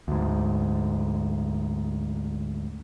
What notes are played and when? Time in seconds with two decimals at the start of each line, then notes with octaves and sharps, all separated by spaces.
0.08 D2 G#2